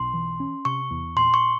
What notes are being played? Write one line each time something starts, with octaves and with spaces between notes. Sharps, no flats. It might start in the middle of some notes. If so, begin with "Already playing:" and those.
Already playing: B1 C6
E3
C#4
C3 C#6
E2
A#2 C6
C#6